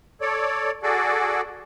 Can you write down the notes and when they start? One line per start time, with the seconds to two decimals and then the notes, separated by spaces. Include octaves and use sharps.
0.21 A4 C#5 D5
0.83 F#4 G#4 A4 D5